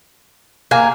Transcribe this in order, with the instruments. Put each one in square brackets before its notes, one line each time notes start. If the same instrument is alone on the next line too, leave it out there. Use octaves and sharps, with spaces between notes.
[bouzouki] A#3 [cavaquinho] G#5